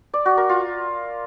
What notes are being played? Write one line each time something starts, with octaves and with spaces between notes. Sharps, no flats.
D5
F#4
A#4
F4